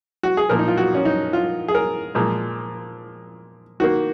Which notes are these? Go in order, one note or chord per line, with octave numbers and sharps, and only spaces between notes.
F#4
G#4
A#2 F3 A#3 A#4
D#4
F4
F#4
C#4
D#4
F4
G#4
A#4
A#2 F3 G#3
D#3 A#3 F#4